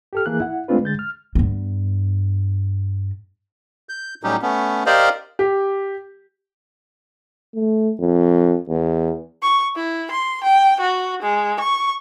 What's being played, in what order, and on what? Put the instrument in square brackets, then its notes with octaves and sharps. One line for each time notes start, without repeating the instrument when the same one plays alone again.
[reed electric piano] G4 A4 F6
E3 A#3 G#4 F#6
E4 F#5
G#3 A3 C4 D4 F4 B4
D3 G#3 G6 A6
F6
[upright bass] G2 B3
[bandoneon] G6
A2 F#3 G3 C#4 D#4 G4
A3 B3 C#4
G4 A#4 C5 D5 D#5 F5
[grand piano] G4
[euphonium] A3
F2
E2
[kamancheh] C#6
E4
C6
G5
F#4
G#3
C#6